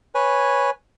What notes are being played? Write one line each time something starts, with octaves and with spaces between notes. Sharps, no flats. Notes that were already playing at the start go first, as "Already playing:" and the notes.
B4 C#5 G#5